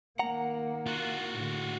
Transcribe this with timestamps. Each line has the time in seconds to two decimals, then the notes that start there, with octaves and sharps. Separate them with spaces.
0.19 D#3 A#3 F#5 A#5
0.86 F4 F#4
1.33 A2 D3